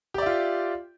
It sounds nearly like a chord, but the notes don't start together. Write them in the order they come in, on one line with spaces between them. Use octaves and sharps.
G4 D5 E5 F4